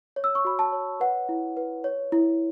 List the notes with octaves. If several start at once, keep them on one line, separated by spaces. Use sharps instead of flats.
C#5
E6
C#6
F#4 B5
A5
C#5
B4 F#5
E4
B4
C#5
E4